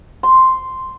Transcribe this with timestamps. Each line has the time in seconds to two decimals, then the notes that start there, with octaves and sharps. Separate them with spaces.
0.23 C6